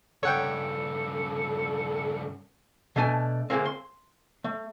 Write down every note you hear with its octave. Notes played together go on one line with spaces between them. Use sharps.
G2 C#3 A4 C#5 F#5 G5
B2 A3 D4 E5 G#5
D2 E3 G#3 A#3 C4
C6
A3